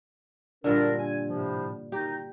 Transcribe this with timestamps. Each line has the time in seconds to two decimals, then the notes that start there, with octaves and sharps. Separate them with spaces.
0.64 G2 A#2 D3 D4 A#4
0.99 G#5
1.27 A2 C3 F3
1.92 D#3 D#4 G4